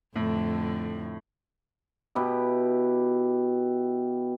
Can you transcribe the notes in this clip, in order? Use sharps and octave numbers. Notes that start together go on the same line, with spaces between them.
F2 A2 D3 A3
B2 E4 G4